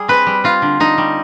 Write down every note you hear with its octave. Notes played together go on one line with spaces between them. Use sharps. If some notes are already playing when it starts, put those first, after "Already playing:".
Already playing: G3 G#4
C4 B4
G3
C4 F4
D3
D3 D#4
G3